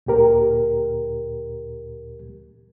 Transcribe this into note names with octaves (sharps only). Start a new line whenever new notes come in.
D2 A#2 G4 A#4